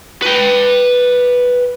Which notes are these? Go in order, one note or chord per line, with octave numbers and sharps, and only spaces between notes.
B4 G5